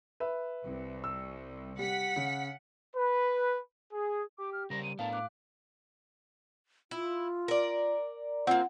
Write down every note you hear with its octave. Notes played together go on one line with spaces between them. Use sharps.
B4 E5
C2
E6
G3 F#5 B6
C#3
B4
G#4
G4 D6
F6
C#3 G3 A#4 C5 A#6
D#7
A2 B3 D4 A#4 F5 A5
D6 F#6
E4 F4
A#4 D5
A#3 C4 F4 F#5